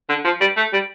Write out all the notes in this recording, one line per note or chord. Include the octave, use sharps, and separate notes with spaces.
D3
F3
G3
A3
G3